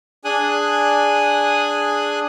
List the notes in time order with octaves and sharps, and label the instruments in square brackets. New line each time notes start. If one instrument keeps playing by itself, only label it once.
[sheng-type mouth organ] D4 G#4 G#5 D#6 F#6